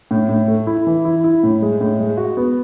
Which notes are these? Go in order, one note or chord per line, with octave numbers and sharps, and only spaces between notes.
A2
A2
A3
E4
E3
E4
E4
A2
G#3
A2
G#3
F#4
B3